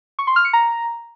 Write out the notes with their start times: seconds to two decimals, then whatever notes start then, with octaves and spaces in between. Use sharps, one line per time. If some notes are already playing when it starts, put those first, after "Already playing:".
0.19 C#6
0.27 C6
0.36 F6
0.45 C#7
0.53 A#5